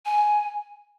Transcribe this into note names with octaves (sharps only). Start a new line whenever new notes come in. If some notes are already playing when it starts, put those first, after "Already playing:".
G#5